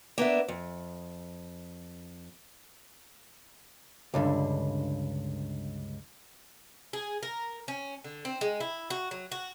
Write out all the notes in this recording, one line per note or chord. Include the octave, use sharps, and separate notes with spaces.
A#3 B3 D4 E5
F2
C#2 G2 D3
G#4
A#4
C#4
D3
C4
G#3
E4
F#4
F#3
F#4